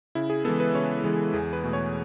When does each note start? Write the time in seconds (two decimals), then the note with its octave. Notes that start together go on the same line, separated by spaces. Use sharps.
0.15 C#3 E4
0.30 G#4
0.45 E3 G#3 B3 A4
0.60 B4
0.74 C#3 C#5
1.04 E3 G#3 B3
1.33 E2 G#4
1.53 B4
1.64 B2 A3
1.73 C#5